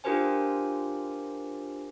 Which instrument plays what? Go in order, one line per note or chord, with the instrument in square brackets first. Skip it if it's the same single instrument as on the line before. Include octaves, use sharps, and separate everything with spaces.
[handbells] D4 F4 G4 A#4 C5 G#5